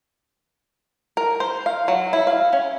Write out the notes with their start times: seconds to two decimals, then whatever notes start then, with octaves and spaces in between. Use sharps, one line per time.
1.17 A#4
1.40 C5
1.66 F5
1.88 F#3
2.13 E4
2.27 F5
2.53 C#4